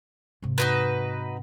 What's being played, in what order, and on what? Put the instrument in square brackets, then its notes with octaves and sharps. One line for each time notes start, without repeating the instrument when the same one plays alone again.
[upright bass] G#2 C3
[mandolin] D#4 F#4 B4